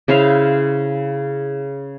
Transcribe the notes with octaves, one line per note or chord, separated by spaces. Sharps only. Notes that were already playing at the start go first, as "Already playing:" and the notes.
C#3 E4 C5 F5